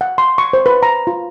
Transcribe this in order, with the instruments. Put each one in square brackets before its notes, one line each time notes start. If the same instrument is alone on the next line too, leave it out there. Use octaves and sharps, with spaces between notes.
[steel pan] F#5
C6
C#6
C5
B4
A#5
F4